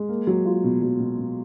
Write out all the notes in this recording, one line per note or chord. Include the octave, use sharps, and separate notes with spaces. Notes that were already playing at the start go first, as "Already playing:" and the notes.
Already playing: G#3
A#3
F#3
F4
B2
F#3
B2
B2